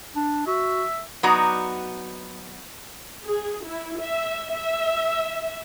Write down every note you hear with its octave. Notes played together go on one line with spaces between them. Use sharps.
D4
F#4 E5
F#3 B3 D#4 F#4 D5 A#5
G#4
E4
E5
E5